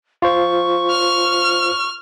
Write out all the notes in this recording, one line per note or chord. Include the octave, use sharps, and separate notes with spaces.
F4 C5 C#6
F6